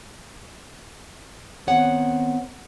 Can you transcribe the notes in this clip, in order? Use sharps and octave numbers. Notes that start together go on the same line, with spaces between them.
D#3 B3 C4 C#5 F#5